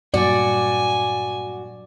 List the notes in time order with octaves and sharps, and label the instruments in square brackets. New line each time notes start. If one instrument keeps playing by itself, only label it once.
[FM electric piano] G2 A#2 F#3 [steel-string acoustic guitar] F#4 [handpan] D5 [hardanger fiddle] G#5